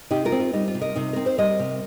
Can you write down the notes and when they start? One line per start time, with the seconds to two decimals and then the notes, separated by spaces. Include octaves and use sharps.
0.11 C3 D#4 G4
0.25 F4 A#4
0.32 C4
0.40 F4
0.53 G3 D#4
0.68 F4
0.74 C3
0.81 A#4 D#5
0.96 C3 D#4
1.13 C4 A#4
1.26 C5
1.38 G3 A#4 D#5
1.59 C3